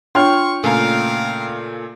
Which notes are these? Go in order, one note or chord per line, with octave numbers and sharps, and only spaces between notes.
D4 F4 C#5 G5 C6 C#6 F6
A#2 C#3 A3 A#4 F5 G#5 A#5